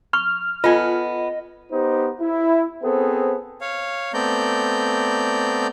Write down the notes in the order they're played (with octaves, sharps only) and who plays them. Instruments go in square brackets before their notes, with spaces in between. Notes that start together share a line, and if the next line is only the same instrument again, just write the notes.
[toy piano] C#6 [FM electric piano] F6
[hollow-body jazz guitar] B3 A4 G#5 [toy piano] F4 [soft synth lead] D#5
[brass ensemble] B3 D#4 G4 C5
E4
B3 C4 G#4 A4 C5
[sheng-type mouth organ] C#5 F5
A3 B3 C4 D5 A#5 G6